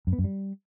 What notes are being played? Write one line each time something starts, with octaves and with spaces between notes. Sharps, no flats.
F#2
B3
F#2
G3